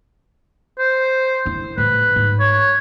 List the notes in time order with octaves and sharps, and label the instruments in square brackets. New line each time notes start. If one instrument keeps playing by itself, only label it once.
[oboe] C5
[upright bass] D#3 E4
[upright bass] A2 [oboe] B4
[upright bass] G#2
[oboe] C#5